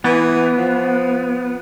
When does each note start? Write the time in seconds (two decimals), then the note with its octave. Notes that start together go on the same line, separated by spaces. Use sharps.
0.04 E3 B3
0.57 F3